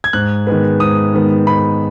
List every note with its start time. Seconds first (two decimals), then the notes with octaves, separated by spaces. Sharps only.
0.04 G#6
0.13 G#2 F#6
0.47 D#3 G#3 B3
0.80 G#2 D#6
1.14 D#3 G#3 B3
1.47 G#2 B5